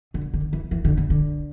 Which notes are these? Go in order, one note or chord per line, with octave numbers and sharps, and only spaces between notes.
D3
D3
E3
E3
D3
C#3
D3